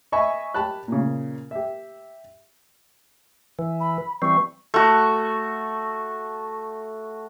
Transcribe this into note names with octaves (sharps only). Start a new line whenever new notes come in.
D#5 E5 G#5 B5 C#6
G4 A5 B5 F#6
A#2 C#3
G4 E5
E3
B5
E3 G3 C4 C#6
A3 F#4